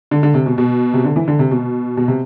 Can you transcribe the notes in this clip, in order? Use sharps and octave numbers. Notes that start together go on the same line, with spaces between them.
D3
D3
C3
B2
B2
C3
D3
E3
D3
C3
B2
B2
C3